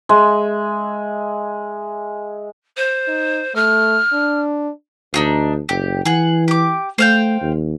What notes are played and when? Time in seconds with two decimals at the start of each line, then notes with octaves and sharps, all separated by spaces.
0.09 G#3 E5
2.77 C5
3.08 D#4
3.55 A3 F6
4.13 D4
5.14 D2 D4 D#4 F4
5.69 F#1 G4
6.05 E3 G#4 F#5
6.48 G4 D6
6.98 A3 C5 F5 G5
7.42 D#2